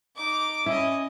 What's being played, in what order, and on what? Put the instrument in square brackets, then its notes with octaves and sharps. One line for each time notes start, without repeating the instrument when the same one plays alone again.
[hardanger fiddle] D#4 D6
[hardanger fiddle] C#4 D#5 [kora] E4